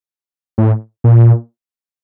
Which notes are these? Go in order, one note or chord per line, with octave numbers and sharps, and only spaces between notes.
A2
A#2